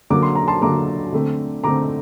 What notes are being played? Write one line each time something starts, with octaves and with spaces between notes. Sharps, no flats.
D3 F#3 A#3 D6
C6
A#5
A5 C6
D3 F#3 A#3 A#5 D6
D3 A3 C4
D3 A3 C4 A#5 D6